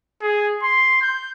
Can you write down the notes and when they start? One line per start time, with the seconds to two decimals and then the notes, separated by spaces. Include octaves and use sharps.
0.21 G#4
0.63 C6
1.02 G6